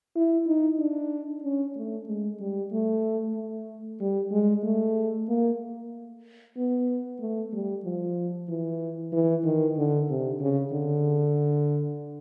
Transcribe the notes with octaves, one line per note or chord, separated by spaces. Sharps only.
E4
D#4
D4
C#4
A3
G#3
G3
A3
A3
G3
G#3
A3
A#3
B3
A3
G3
F3
E3
E3
D#3
D3
C3
C#3
D3